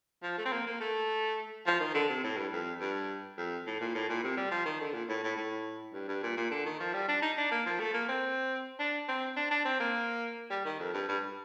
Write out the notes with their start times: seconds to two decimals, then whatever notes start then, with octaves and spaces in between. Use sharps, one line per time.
0.23 F3
0.37 A3
0.46 C4
0.52 A#3
0.67 A#3
0.80 A3
1.66 F3
1.80 D#3
1.94 D3
2.09 C3
2.24 A2
2.37 G2
2.52 F2
2.80 G2
3.37 F2
3.66 A2
3.81 A#2
3.95 A2
4.09 A#2
4.23 C3
4.37 G3
4.51 F3
4.65 D#3
4.81 D3
4.94 A#2
5.09 A2
5.23 A2
5.37 A2
5.94 G2
6.08 G2
6.23 A#2
6.37 A#2
6.51 D3
6.66 D#3
6.80 F3
6.94 G3
7.08 D4
7.22 D#4
7.38 D4
7.52 A#3
7.66 F3
7.79 A3
7.94 A#3
8.08 C4
8.79 D4
9.09 C4
9.37 D4
9.51 D4
9.65 C4
9.80 A#3
10.50 G3
10.65 D#3
10.80 F2
10.94 G2
11.08 G2